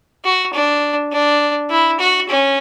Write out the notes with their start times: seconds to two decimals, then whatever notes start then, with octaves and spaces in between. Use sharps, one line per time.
0.25 F#4
0.53 D4
1.12 D4
1.70 E4
2.00 F#4
2.28 C#4